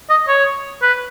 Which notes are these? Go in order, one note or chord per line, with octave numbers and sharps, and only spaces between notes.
D#5
C#5
B4